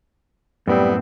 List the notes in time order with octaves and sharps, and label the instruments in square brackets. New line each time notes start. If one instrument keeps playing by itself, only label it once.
[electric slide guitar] F#2 A2 C4 [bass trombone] G3 [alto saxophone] B3